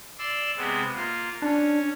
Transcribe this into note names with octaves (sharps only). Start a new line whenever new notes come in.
D5 C6 E6
C3 G#3 B3
A#3 F4
C#4 D4